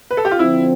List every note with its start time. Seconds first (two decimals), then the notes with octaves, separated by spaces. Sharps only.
0.11 B4
0.17 A4
0.25 G4
0.31 F4
0.39 D3 F3 C4 E4